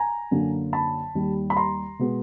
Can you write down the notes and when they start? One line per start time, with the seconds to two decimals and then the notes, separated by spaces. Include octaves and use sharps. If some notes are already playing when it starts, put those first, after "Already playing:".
Already playing: G#5 A#5
0.31 F#2 D3 F#3 A#3
0.73 A5 B5
1.15 D#2 D#3 G3
1.50 B5
1.56 A#5 C6
1.99 B2 G#3 B3